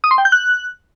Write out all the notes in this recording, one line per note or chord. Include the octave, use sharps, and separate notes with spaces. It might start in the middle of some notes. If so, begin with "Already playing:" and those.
D#6
C6
G5
G6
F#6